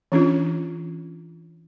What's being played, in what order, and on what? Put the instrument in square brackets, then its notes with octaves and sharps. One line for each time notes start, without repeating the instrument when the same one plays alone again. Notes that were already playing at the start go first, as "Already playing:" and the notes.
[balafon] E3 C#4 D4 F4